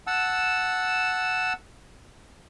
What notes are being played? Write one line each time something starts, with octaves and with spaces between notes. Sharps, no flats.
F#5 A5 E6